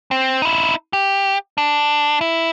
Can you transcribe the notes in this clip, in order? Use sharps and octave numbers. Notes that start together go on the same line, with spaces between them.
C4
D#4 E4
G4
D4
E4